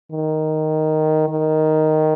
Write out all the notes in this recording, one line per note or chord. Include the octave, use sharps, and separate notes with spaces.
D#3
D#3